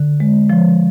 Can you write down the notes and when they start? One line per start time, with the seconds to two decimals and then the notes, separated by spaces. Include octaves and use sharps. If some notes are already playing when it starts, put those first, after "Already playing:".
Already playing: D3
0.20 G#3
0.50 F3